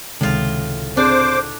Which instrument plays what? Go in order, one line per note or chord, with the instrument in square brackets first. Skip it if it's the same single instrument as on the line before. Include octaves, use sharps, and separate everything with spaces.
[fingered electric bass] C#2 C3 [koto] A2 F4 [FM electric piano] D#3 G#3
[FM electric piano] C4 G#4 [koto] D4 [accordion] C5 D6